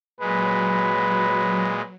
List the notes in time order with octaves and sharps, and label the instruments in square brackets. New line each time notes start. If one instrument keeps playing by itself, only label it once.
[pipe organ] A#2 G#3 [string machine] F#3 [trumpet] B4